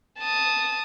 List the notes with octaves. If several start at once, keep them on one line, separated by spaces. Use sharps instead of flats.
A5 D#6